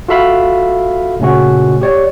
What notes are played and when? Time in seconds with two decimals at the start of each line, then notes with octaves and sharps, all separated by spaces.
0.08 F4 F#4 A4 E5 F5 B5
1.19 A#2 C#3 A3 C#4 F#4
1.81 G4 C#5 D5